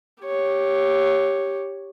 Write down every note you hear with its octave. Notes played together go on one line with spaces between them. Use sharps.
G4 C#5